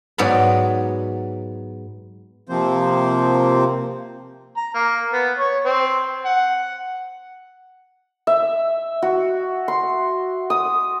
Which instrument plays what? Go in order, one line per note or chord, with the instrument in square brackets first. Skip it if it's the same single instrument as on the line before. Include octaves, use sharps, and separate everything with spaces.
[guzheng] G#2 F#3 B3 D5 A#5 B5
[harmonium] C3 F3 A#3 C4 C5
[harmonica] A#5
A#3
B3
C#5
C4
F#5
[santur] E5
F#4
C6
D#6